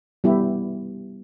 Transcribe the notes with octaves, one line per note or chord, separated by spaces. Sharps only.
G3 B3 E4 G4